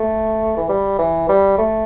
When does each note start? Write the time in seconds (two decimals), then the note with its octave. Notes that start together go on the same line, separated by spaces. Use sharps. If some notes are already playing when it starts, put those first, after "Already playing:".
Already playing: A3
0.57 E3
0.69 G3
0.99 E3
1.29 G3
1.58 A3